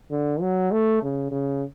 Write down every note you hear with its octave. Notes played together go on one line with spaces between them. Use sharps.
D3
F#3
A3
C#3
C#3